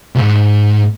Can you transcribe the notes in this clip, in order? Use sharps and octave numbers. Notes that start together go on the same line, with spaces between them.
B1 G#2